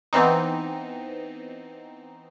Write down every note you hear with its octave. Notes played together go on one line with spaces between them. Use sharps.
E3 B3 C4 D#4